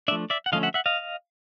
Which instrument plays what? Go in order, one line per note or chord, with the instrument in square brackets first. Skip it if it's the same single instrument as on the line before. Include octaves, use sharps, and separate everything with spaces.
[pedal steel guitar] D4 D5 E5
F3 A3
D5 E5
F#5
D3 F3 A3 C#4 D#5 F5
E5 F#5
E5 F#5
D#5 F5